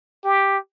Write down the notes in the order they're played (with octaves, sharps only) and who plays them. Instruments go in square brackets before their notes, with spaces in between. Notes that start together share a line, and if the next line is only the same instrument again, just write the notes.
[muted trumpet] G4